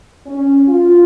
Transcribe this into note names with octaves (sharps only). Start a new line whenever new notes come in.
C#4
F4